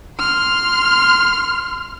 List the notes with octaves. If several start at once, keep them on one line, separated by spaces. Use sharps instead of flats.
C6 F6